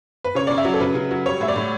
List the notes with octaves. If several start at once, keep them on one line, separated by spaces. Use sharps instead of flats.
B4
C#3 C#5
C#3 D5
E5
F#3
A4
C#3 B4
C#3
F#3
G3 C#5
A2 E5
D5
A2